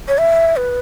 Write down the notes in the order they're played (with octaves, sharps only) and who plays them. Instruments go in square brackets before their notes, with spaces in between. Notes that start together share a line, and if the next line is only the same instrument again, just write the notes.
[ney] C#5
E5
B4